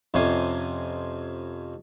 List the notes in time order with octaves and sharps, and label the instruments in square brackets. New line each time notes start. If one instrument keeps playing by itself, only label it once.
[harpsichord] F2 C3 C#4 G#5 C6